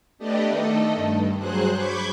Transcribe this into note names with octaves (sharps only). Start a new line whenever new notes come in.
A3 B3 D4 G4 D5 D#5
D#3 A3 A4 D#5
G2
G2 F#3 G#4 C5 F#6
B5 C#6 D6 G6 G#6 B6